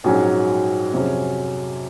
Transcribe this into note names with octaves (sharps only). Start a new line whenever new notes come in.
A#1 G#2 F#3 C#4 G#4
F2 C3 F#3 C#4 G#4